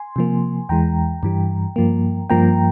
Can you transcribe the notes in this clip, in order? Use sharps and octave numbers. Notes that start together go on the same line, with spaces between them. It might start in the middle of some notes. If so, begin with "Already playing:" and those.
Already playing: G#5 C6
C3 F3 A#3
E2 E3 G#3 G5 A#5
G2 E3 G3
G2 F3 A#3
G2 F3 A#3 G5 A#5